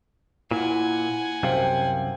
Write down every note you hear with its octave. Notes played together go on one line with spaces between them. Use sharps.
A#2 E4 F#5 G#5
C2 F#2 C3 C5 F5 G5